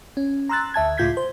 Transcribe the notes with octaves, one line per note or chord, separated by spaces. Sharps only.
C#4
A#5 C6 E6 F#6 A6
D2 E5 A5 G#6
C#2 A2 F4 G6 G#6 B6
C5